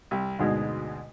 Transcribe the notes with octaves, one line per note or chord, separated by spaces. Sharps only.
C2
D2 G#2 B2 G#3